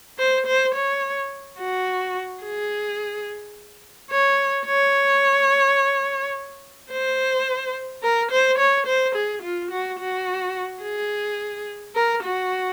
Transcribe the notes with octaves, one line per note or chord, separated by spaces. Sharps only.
C5
C5
C#5
F#4
G#4
C#5
C#5
C5
A#4
C5
C#5
C5
G#4
F4
F#4
F#4
G#4
A#4
F#4